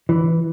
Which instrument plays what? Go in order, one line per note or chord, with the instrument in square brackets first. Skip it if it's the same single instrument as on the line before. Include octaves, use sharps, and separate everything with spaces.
[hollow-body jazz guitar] E3